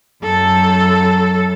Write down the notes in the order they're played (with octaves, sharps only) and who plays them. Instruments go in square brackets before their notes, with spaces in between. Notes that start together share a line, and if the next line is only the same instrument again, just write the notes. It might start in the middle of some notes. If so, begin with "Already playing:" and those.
[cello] F#2 A4